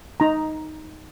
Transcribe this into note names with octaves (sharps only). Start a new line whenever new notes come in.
D#4 A#5